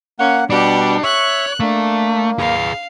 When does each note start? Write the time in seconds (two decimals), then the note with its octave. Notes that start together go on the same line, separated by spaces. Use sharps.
0.19 A#3 C#4 F#5
0.50 B2 G3 D4 G4 F#5
1.04 C#5 E5 C#6 F#6
1.60 A3 A#3 D4
2.39 G#4 B4 F5